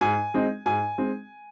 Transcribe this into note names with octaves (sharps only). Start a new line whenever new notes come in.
G#2 G#5
G#3 C4 D#4
G#2 G#5
G#3 C4 D#4